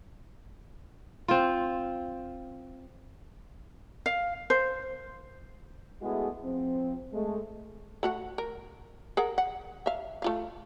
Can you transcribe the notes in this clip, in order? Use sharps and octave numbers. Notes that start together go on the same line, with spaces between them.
C4 F4
F5
C5
G#3 A3 B3 E4 F#4 G#4
F3 C4
G#3 A3
A3 F#4 F#5
A#4
G#4 A#4 F#5
F#5
E5 F5
A3 F4 F5